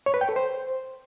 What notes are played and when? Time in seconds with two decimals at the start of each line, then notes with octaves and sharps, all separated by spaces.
0.06 C#5
0.14 B4
0.21 G5
0.29 A4
0.36 C5